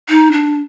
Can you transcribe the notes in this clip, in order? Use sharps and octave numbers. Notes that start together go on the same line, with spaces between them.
D#4
D4